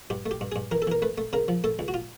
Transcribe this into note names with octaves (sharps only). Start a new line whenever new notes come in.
G2 G4
A3
G4
G2
G2 G#4
E3 A#4
A4
E3 A#4
A3 B4
A3
C#3 A#4
F3
A3 A4
C#2
F#4
F4